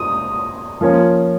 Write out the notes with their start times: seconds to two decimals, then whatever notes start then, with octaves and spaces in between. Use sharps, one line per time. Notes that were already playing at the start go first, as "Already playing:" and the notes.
Already playing: D#6
0.81 F3 A#3 C#4